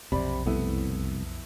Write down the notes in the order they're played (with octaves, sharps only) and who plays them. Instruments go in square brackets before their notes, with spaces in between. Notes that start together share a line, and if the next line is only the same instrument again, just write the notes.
[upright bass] B1 F2 [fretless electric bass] C3 [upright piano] D5 B5
[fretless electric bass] C2 [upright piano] A3 B3 E4